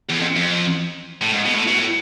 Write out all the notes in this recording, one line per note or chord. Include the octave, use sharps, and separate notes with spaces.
E2
F2
F2
A2
G#2
B2
A2
B2
A2